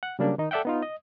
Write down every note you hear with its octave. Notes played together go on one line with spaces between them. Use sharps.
F#5
C#3 F#3 G3 A#3 D4
D#3 D#4
A4 D5 E5 F#5 G5
B3 D#4 F4
D#5